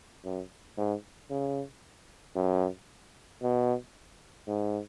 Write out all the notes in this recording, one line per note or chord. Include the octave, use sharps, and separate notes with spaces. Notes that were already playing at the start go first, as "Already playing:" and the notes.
F#2
G#2
C#3
F#2
B2
G#2